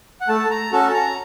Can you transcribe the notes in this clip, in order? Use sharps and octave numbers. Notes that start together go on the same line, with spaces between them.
F#5
A3 A5
A#5
C#4 F#4 A4 A5
A#5